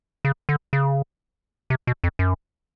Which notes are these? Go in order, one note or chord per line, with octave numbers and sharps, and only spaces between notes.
C#3
D3
C#3
C3
B2
F2
F#2